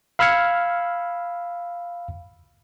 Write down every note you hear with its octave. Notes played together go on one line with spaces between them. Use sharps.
F5 B5 E6 F6 G#6 C#7